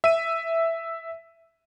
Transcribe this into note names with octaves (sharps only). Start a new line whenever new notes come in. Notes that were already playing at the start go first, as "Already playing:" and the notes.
E5 D#7